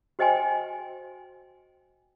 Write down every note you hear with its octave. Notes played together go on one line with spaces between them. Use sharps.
F#4 C5 D#5 G5 G#5 C6